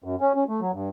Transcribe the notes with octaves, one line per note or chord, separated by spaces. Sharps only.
F#2
C#4
C#4
A3
F#3
G2